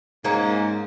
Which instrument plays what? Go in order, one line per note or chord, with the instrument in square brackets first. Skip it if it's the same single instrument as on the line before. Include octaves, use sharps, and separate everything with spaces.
[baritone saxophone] G#2 [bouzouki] A#3 C#4 [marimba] A#4 A#5